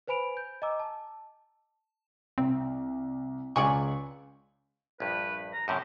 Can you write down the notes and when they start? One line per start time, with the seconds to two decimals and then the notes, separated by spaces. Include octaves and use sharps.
0.08 B4 C5 G#5 B5 D7 F7
0.37 G6
0.62 D#5 G#5 A#5 D6 E6
0.80 A5
2.38 C2 C4
3.56 C#2 G#3 D5 G#5 C#6
5.00 A#1 G2 B4
5.53 A#5
5.68 F#2 A2 C3 G4